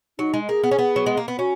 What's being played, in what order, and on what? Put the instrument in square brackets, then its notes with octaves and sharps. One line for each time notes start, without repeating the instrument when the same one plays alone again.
[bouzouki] F#3 [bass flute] D#4
[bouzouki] G#3
[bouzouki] A#3 [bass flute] G#4
[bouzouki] B3
C#4
B3
F#3
G#3
A#3
B3
[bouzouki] C#4 [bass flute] F#4